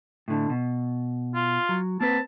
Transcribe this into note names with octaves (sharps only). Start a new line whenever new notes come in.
A2 D3
B2
F4
F#3
A#3 C4 B4 A5